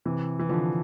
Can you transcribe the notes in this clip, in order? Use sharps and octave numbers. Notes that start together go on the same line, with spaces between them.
C3 E3
E3
D3 F3